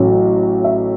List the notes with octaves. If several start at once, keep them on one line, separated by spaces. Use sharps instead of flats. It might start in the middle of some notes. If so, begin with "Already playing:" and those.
Already playing: A1 A2 F#3
E5